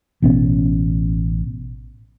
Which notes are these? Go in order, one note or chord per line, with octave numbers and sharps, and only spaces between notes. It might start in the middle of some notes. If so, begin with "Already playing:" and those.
A1 B2 B3 C#4